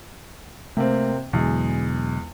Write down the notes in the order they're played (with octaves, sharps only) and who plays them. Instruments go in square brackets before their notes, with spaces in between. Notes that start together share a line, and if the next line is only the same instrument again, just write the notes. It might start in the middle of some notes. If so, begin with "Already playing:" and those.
[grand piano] C3 A#3 C4 [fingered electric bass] A3
[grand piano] E2 G#3 [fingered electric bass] B2 D3 F#3